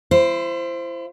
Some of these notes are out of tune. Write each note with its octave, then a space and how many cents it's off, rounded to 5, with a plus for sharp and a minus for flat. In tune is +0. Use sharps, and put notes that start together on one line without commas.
E4 +40 C5 +0